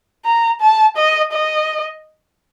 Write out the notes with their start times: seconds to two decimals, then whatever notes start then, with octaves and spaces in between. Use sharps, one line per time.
0.25 A#5
0.61 A5
0.97 D#5
1.32 D#5